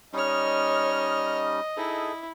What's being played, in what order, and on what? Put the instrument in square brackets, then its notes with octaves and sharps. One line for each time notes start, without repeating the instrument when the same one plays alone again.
[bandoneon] G3 C#4 D#4 [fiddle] C#5 F6 [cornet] D#5
[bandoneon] D#4 G#4 A4 [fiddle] E4